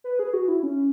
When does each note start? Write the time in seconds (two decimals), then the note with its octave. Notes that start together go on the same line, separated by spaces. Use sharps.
0.04 B4
0.19 G#4
0.33 F#4
0.48 E4
0.63 C#4